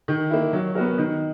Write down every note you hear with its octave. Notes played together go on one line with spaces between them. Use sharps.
D#3
A#3 E4
F#3
B3 F#4 A#4
D#3